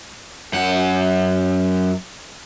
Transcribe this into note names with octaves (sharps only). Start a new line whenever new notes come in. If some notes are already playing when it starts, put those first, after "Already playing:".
F#2 F#5